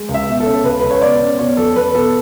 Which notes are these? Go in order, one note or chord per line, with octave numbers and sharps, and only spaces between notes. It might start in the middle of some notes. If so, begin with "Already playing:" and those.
Already playing: G#3
C#2
E5
B2
A4
C#4
C#2 B4
C#2 B4
C#5
B2 D5
C#4
B2 C#5
E2 A4
E2 B4
B2 A4